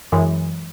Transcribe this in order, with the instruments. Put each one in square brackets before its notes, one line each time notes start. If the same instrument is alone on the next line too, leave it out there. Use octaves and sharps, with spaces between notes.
[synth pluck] F#2 E3 G#3